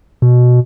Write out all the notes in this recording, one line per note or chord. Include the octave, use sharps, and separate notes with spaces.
B2